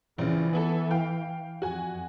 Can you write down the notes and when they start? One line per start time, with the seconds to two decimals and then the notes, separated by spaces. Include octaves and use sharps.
0.18 A#1 C#3 E3
0.53 B3 E4 A4
0.91 F5 G5
1.62 F2 F#4 G#5